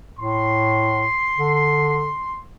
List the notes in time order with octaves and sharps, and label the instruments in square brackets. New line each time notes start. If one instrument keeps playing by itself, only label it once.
[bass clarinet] A2 [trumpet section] C6
[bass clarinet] D3